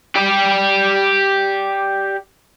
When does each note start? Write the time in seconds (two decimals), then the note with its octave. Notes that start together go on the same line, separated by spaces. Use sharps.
0.15 G4 D5